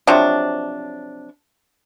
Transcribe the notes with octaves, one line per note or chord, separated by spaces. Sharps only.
C3 F3 F#3 D4